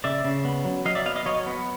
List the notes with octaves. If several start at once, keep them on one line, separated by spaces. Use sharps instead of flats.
C#3 D5 E5
C#3
B3
F#3
F#3 D#5 F5
D5 E5
B3 D#5 F5
D#5 F5
F#3 C#5 D#5
B3